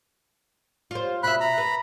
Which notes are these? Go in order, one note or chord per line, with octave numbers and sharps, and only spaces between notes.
F4 C5
B2 E5 B5 F#6
A#5 B5
B4